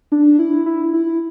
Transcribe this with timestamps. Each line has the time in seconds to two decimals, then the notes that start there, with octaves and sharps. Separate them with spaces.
0.12 D4
0.39 E4
0.66 E4
0.93 E4